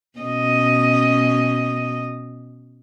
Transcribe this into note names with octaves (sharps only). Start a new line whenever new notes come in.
B2 C#4 D#5